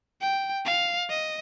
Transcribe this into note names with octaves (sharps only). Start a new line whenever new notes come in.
G5
F5
D#5